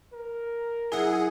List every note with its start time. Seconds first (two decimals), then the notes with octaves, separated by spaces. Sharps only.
0.13 A#4
0.92 F#2 E4 G#4 F#5